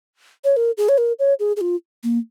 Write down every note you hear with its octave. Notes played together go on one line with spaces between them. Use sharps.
C#5
A#4
G#4
C#5
A#4
C#5
G#4
G#4
F4
A#3